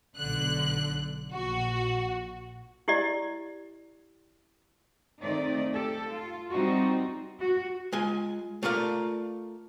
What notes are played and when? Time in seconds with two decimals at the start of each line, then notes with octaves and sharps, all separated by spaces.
0.16 B1 D3 F#6
1.28 A#1 F#4
2.88 E4 G4 D5 D#5
5.22 D#3 A3 C4 D#4 D5
5.72 G4 A4
6.11 F4
6.52 G3 C4 D#4 F#4
7.39 F#4
7.93 G#3 F4 G#5
8.63 A3 F4 A#4 D5 F5